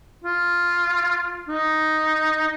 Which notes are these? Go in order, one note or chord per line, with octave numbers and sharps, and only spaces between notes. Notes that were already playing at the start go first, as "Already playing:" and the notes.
F4
D#4